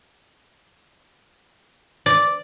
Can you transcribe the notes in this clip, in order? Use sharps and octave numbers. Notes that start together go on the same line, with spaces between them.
D5